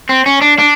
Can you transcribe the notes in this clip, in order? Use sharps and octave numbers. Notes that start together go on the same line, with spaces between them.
C4
C#4
D4
D4